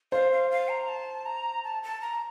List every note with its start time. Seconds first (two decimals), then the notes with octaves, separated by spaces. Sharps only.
0.12 C5 F5
0.32 F5
0.51 F5
0.69 A#5
0.89 A5
1.26 A#5
1.64 A5
1.83 A5
2.01 A#5